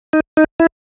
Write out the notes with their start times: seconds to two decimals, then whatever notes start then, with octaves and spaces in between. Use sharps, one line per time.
0.13 D#4
0.37 D#4
0.60 E4